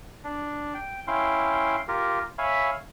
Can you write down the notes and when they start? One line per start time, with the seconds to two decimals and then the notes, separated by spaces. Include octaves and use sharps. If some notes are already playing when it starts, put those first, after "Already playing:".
0.24 D4
0.74 G5
1.07 C#4 E4 F5 G5 C6
1.88 F4 G4 A#4
2.38 C#5 E5 F5 G#5 B5